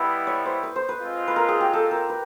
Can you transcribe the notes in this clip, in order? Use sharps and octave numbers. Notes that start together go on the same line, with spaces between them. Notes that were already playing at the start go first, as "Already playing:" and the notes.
Already playing: G3 B3 E4 D#5
C#5
C5
B4
C5
B4
G#3 C4 F4
B4
A#4
G#4
G4
A4
A#4
B4